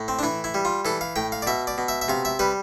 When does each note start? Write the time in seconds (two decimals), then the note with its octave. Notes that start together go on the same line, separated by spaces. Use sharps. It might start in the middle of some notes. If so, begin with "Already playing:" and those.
Already playing: A2
0.08 C4
0.19 D4
0.23 E3 E4
0.44 E4
0.54 G3
0.65 F4
0.85 E3 A4
1.01 F5
1.16 A2 G5
1.32 F5
1.42 D5
1.47 B2 E5
1.67 D5
1.78 B2
1.88 E5
2.01 E5
2.08 C3 F5
2.25 E5
2.39 G3 B4